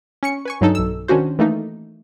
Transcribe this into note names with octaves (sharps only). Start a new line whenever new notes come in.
C#4 C#6 C#7
B4 G#5 C#6
G2 F#3 D#4 A4
B1 E6
D#3 C#4 D4 F#4 C5
E3 A3 A#3 D#4